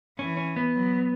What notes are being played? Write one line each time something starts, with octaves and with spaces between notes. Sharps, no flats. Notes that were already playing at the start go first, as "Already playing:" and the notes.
E3 C#4
C#4
B3
F#3